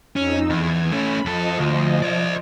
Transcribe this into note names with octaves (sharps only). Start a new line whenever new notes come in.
F2 C#4 D#4 E6
E2 G#6
A3 C#4 B5
F2 F3 A4 D#5
D2
C5 D5